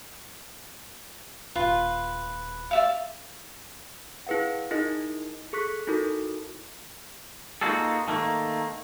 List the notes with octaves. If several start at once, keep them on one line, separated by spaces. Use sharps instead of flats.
D#1 F4 B4
D5 E5 F5
E4 G#4 B4 F5 F#5
D#4 E4 G#4 A#4 D#5
G#4 A4 C#6 F#6 B6
D#4 E4 F#4 A4 A#4
A#3 D#4 F4 F#4 G#4 A4
D#3 A3 A#3